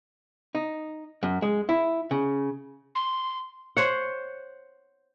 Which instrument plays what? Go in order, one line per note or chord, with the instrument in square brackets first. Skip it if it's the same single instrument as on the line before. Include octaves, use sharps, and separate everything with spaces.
[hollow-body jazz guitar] D#4
F#2
G#3
E4
C#3
[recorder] C6
[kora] C5 C#5 F#5